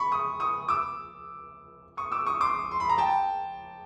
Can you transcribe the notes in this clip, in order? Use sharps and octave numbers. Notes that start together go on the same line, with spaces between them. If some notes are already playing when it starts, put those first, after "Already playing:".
Already playing: B5 C#6
C#6 D#6
C#6 D#6
D6 E6
C#6 D#6
D6 E6
C#6 D#6
C6 D6
C6
B5
A#5
G5 A5